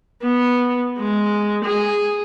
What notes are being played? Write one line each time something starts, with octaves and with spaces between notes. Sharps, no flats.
B3
G#3
G#4